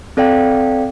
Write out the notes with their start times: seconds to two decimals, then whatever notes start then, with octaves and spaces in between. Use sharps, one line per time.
0.17 C4 A4 D5 F5 G5